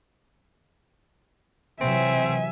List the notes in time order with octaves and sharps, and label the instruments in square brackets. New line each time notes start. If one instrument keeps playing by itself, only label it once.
[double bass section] C3 E3 F#3 [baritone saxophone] C4 [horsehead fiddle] E5 G#5